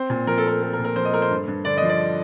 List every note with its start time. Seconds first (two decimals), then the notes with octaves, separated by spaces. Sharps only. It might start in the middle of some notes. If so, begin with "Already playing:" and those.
Already playing: C4 C5
0.10 A#2
0.27 F3 A#4
0.38 A4
0.45 A3 A#4
0.62 C4 A4
0.73 A#4
0.79 A#2
0.84 A#4
0.96 F3 C5
1.05 D#5
1.13 A3 A#4
1.22 C5
1.31 G2
1.48 G2
1.65 D3 D5
1.77 F3 D#5
1.89 D5